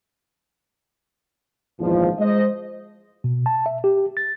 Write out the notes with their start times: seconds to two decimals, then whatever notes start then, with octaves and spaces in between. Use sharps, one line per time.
1.80 G#1 E2 A#2 F3
2.19 G#3 C5 D#5
3.24 B2
3.46 A5
3.66 E5
3.84 G4
4.17 A6